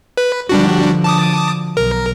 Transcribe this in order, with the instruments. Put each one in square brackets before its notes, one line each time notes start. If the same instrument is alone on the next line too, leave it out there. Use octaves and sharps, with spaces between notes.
[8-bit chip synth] B4
[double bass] D3 F3 [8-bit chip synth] G3 D4 F#4
[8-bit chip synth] A5 D6 D#6
[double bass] B1 [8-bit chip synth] A#4